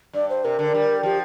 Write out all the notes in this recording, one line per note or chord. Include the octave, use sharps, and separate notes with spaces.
G2 D5
C5
C3 A#4
D3
G3
F3 G4